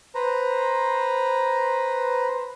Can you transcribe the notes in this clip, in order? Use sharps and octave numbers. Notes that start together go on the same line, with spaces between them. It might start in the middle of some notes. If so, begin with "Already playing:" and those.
B4 C5 A#5